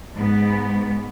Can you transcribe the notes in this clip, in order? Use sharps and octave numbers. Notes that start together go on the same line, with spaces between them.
G#2 B3